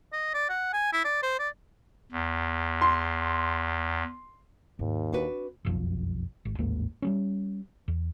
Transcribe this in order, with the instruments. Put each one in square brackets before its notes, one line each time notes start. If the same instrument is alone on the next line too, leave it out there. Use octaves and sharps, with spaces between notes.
[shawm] D#5
D5
F#5
G#5
E4
D5
C5
D5
[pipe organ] E2
[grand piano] C6
[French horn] D#2 [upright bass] G#2
[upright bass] C4 [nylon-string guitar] D4 F#4 B4
[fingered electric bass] F#1 B1 F2
G#1
A1 D#2 G#2 A#3
G3 A3 C#4
E2